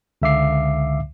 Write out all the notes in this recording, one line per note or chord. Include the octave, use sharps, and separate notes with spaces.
C#2 D3 E5 F5 D6 C7